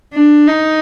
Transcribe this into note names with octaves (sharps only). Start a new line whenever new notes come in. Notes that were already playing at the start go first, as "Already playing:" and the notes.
D4
D#4